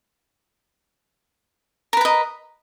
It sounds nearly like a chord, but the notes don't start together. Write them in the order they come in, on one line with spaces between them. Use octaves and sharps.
A#4 B4 A#5 D#5